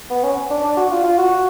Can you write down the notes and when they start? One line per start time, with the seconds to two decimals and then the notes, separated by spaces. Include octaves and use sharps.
0.10 B3
0.23 C#4
0.50 D4
0.64 D4
0.77 F#4
0.91 F4
1.04 F4
1.18 F#4